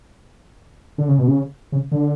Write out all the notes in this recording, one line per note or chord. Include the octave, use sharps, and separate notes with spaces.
D3
C#3
B2
C#3
C#3
D3